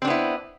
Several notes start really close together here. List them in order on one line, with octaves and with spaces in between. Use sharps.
C4 D4 B3 E4